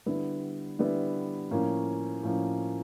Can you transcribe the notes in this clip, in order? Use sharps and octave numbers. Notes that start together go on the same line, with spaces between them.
D3 G3 B3 E4
D3 G3 B3 E4
A2 F3 A#3 C#4
A2 F3 A#3 C#4